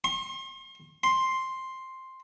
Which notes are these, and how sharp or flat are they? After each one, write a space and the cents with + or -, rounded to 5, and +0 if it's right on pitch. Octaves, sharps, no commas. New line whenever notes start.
C6 +40
C6 +5